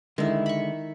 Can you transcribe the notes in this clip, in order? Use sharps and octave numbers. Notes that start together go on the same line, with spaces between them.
D3 D#3 G#3 E4
B5 C#6